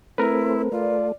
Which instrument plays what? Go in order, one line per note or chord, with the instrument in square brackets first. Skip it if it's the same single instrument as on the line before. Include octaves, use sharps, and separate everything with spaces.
[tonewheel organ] A3 C4 [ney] E4 [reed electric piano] A#4 B4
[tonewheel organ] A3 [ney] F4 [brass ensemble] D5